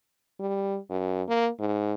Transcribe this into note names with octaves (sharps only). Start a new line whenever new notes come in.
G3
F#2
A#3
G#2